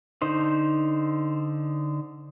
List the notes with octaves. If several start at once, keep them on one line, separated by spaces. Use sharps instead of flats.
D3 D#4 C5